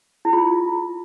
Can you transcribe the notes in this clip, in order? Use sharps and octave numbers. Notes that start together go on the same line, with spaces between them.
E4
F4